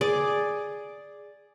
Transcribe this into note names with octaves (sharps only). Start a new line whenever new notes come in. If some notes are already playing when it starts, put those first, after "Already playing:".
G#4 D5